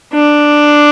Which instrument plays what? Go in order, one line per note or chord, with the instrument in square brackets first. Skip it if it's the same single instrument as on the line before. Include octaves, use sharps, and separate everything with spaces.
[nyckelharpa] D4